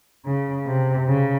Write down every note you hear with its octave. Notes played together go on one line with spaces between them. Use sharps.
C#3
C3
C#3